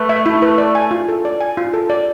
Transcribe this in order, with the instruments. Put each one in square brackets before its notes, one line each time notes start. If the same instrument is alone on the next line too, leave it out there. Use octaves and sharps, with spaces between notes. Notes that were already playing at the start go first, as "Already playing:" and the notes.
Already playing: [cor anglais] A3 [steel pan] B4
[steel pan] E5
E4
B4
D5
G#5
F4
A4
D5
G#5
F4
A4
D5